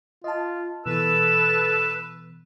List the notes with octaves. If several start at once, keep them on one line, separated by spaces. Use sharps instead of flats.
F4 D#5 A5
B2 E3 A4 B4 E6